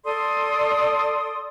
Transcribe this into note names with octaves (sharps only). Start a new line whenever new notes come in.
A4 D5 C6 D#6